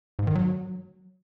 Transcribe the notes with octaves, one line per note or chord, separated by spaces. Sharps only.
G#2
D#3
F#3